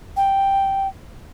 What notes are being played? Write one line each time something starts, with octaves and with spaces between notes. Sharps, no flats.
G5